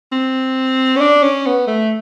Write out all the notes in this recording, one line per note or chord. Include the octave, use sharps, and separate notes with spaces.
C4
C#4
D4
C#4
B3
A3